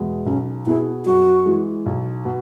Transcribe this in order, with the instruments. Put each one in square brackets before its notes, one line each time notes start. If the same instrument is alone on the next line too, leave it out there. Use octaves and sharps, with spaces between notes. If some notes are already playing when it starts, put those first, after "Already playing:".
Already playing: [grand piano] E2 B2 G#3
[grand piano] B1 [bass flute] C#4
[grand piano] B2 B3 G#4 [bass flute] E4
[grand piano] F#2 [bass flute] F#4
[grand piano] E3 G#3
B1
B2